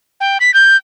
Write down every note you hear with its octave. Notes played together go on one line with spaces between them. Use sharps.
G5
B6
G6